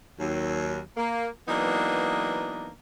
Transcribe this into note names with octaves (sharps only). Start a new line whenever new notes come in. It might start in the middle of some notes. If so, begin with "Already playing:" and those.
D#2 F#3
A#3
E3 F#3 A#3 B3 D4 D#4